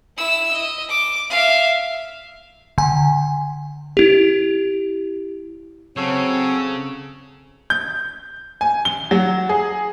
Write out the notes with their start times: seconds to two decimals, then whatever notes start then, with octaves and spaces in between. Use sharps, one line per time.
0.17 E4 E6
0.53 D#5
0.89 D6
1.30 E5 F5
2.78 D3 G#5
3.97 E4 G4
5.97 C#3 F#3 C4 A4 C#5
7.70 G6
8.61 G#5
8.85 G7
9.11 F#3
9.49 G#4